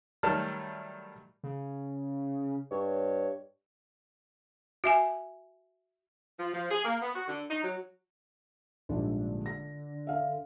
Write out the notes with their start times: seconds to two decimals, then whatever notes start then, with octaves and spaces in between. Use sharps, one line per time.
0.23 D#3 F#3 G3 A3 A5 F6
1.43 C#3
2.71 G2 C#5
4.84 F#4 E5 G#5
6.39 F3
6.53 F3
6.70 G#4
6.84 A#3
7.01 B3
7.15 F#4
7.27 D3
7.50 D#4
7.63 F#3
8.89 A#1 G#2 D3 G3
9.46 A#6
10.07 E5 F5